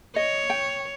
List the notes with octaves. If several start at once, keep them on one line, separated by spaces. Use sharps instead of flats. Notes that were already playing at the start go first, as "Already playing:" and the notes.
C#5 D#5
G5